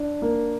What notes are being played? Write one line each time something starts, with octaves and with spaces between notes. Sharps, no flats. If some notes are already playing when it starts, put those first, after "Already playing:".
Already playing: D4
A#3